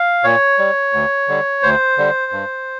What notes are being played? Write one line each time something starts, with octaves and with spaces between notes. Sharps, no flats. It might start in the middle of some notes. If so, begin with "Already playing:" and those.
Already playing: F5
A#2 C#5
G3
D2
D3 G3
D2 C5
D3 G3
G2